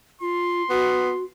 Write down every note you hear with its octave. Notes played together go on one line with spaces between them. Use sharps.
F4 C6
B3 F#4